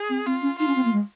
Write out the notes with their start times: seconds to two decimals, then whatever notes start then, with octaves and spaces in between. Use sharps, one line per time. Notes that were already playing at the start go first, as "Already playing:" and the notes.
Already playing: G#4
0.09 C4
0.26 C4 F4
0.42 C#4
0.58 D#4 F4
0.67 C#4
0.75 C4
0.84 A#3
0.92 G#3